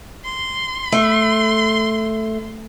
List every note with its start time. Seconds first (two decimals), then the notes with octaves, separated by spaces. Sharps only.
0.24 C6
0.92 A3